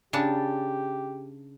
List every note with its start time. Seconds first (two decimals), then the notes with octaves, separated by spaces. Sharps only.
0.13 C#3 D4 G4 A5